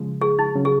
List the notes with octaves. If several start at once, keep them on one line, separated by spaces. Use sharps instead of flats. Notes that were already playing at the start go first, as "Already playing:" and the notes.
Already playing: C#3 F3 G#3
G#4
D#4
C#3 F#3 C#4
G#4